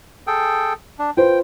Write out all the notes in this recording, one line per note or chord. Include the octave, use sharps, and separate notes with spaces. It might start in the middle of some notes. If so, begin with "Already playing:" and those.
G#4 A4 G5
D4
F4 B4 C5 G5